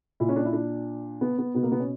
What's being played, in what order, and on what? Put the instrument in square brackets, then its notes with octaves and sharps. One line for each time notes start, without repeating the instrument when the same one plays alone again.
[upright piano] A#2 E4
C#4
D4
E4
D4
B3
B3
B2 B3
A#3
B3
C#4